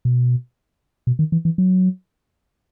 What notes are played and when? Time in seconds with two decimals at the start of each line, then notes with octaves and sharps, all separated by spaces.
0.05 B2
1.07 B2
1.19 D#3
1.32 E3
1.45 E3
1.58 F#3